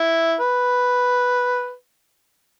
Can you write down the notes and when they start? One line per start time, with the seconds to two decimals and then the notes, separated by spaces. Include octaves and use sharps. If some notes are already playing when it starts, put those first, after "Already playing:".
Already playing: E4
0.40 B4